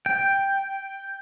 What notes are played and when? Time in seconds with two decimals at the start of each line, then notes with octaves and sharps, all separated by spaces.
0.06 G5